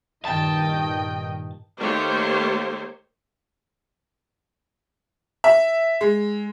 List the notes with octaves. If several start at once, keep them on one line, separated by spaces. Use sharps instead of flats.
G2 A#2 D#3 D#5 G5 A5
D#3 A3 A#3 G4 C5 C#5
E5
G#3